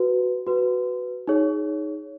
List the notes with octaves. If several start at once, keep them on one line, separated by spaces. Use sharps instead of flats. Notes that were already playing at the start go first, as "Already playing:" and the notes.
Already playing: F#4 B4
F#4 B4
D#4 G#4 C#5